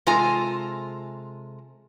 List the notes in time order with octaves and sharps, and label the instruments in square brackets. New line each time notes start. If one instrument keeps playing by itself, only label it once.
[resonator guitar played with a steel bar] C3 G#3 F4 A4 G#5 A#5